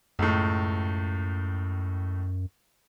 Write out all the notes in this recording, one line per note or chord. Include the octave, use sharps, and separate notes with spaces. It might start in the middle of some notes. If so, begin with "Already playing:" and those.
C#2 F#2 A2